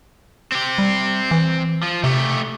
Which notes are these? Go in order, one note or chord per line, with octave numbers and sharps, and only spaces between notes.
C4 G4
G3
E3
F3
C3 A3 G4